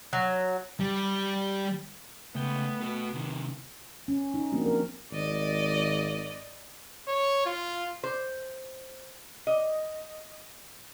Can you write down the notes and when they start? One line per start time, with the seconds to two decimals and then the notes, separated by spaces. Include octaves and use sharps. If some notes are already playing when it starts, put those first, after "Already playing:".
0.13 F#3
0.80 G3
2.35 C#2 A3 B3 G5
2.81 F#4 B4
3.14 C3 D#3
4.08 C#4
4.34 D#4
4.52 F3 A#3 C4 D4 F#4
4.66 A#4
5.12 G#1 D5 D#5
7.08 C#5
7.45 F4
8.04 C5
9.47 D#5